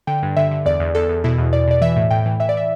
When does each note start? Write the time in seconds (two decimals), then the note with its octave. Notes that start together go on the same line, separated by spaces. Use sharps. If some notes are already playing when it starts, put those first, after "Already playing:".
0.07 D3 G5
0.22 G2
0.36 D3 E5
0.51 D3
0.66 E2 D5
0.80 E2
0.95 E2 A4
1.09 E2
1.24 B2 E4
1.38 E2
1.53 B2 D5
1.68 B2 D5
1.81 E3 E5
1.96 A2
2.11 A2 G5
2.26 E3
2.40 E3 E5
2.49 D5
2.54 E3 E5